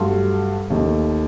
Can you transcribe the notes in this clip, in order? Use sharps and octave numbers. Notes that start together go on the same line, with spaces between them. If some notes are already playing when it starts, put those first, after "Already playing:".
Already playing: G2 F#3 A3 C6
D#2 D#3 A3